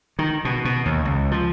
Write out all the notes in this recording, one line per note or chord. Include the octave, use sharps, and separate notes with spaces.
D#3
B2
B2
D#2
C#2
F3